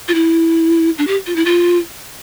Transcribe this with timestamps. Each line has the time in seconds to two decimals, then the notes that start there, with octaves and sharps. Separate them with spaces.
0.08 F4
0.14 E4
0.98 D4
1.07 G4
1.26 F4
1.36 E4
1.45 F4